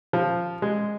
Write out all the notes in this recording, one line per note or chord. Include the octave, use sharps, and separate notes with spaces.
F3
G#3